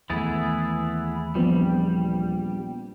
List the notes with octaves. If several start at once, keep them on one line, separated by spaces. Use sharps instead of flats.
D#2 E3 A3 B3 E4 G#4 A6
A#1 F3 G3 B3 C4